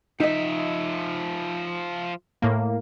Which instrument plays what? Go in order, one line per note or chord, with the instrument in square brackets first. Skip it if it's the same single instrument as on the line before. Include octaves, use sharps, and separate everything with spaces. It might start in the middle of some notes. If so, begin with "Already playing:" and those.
[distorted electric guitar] F3 E5 [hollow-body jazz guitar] D#4 D#5
[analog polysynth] A2 A#3